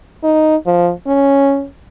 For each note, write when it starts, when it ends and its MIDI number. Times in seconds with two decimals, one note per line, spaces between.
0.23 0.56 63
0.66 0.92 53
1.07 1.66 61